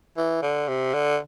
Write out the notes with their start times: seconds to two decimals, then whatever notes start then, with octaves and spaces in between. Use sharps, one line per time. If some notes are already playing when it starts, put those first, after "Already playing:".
0.17 E3
0.42 D3
0.68 C3
0.94 D3